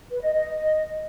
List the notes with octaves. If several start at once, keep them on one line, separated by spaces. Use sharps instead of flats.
B4
D#5
D#5